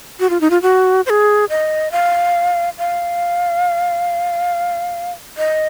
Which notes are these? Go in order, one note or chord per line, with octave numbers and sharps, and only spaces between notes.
F#4
F4
D#4
F4
F#4
C5
G#4
D#5
F5
F5
D#5